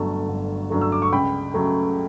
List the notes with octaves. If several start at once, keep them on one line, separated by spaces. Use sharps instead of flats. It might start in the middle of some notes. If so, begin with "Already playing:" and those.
Already playing: G1 G2 F#3 A3 A5
G1
G2 F#3 A3
E6
D6
C#6
C#2 G5 B5
C#3 F#3 A3